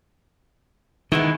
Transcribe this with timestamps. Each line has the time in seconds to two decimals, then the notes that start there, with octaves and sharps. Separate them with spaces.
1.12 D#3 E3 G#3 B3